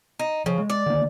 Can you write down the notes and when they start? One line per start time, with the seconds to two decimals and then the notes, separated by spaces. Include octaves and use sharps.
0.19 D#4
0.46 C#3 F3
0.58 G#3
0.70 D5
0.86 D3 D#3 A#3